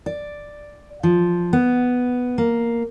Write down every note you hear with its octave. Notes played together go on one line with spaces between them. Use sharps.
D5
F3
B3
A#3